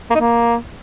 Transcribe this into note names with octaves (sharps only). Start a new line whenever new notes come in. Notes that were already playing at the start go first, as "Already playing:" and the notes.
A#3
D#4
A#3